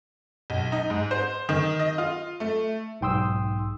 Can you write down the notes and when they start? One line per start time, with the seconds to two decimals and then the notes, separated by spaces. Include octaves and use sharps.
0.50 B1
0.72 D#4
0.90 G#2
1.11 C5
1.49 D#3
1.79 D#5
1.98 F4
2.40 A3
3.01 B1 G#2 G5 C6 D#6 E6